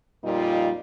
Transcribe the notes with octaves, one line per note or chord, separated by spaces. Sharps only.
F2 A#2 G3 D#4 F4